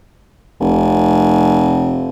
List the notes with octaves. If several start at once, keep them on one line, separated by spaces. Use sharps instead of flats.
F1